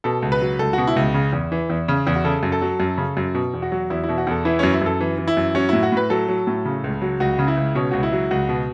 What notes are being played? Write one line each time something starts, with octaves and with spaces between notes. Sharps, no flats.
B2 A4
C#2
B4
F#3
C#2 A4
B2 F#4
E4
C#2
C#3
E2
E3
E2
C#3
E2
F#4
C#3 A4
F#2
A4
F#3
F#2
C#3
F#2
B2
E2
F#4
F#3
E2 E4
E4
B2
F#4
E2 A4
E3 E4
F#2 C#4
E4
F#2 A4
E3
E3
E4
F#2
F#3 C#4
A2 E4
F#4
A2 B4
F#3 A4
F#3
A2
C#3
C#2
F#3
C#2 F#4
C#3
E4
C#2
B2 C#4
C#2 F#4
E4
F#3
C#2 F#4
B2